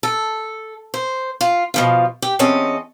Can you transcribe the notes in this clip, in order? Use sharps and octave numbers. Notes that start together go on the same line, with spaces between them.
A4
C5
F4
B2 F3 F4
G4
E2 C4 C#4 D#5 A5